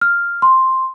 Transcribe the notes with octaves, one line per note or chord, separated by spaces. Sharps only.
F6
C6